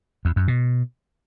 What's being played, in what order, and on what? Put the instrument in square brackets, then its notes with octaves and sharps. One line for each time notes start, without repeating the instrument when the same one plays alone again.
[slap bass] E2
F#2
B2